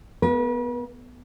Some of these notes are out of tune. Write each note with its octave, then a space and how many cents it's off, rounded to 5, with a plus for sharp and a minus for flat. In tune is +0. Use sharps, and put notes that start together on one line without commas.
B3 +0 B4 -40 F5 +0